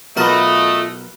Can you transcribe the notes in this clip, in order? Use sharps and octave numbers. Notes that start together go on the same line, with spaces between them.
B1 A3 F4 F#4 A#4 B4 D#5 A5